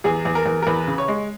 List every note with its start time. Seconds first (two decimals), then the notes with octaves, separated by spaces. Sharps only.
0.04 E2 G#4
0.25 E2
0.35 A#4
0.46 E2
0.62 A#4
0.66 E2 B4
0.88 C#3
0.98 C#5
1.08 G#3